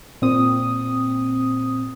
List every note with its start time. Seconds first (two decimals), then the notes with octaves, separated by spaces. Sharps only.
0.22 A#2 C4 D#6